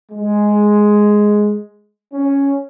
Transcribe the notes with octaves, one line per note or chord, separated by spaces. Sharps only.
G#3
C#4